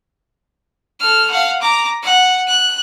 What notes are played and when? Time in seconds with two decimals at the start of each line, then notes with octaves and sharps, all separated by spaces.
1.00 A4 F6
1.30 F5 F#5
1.62 A#5 D6
2.02 F#5
2.47 F#6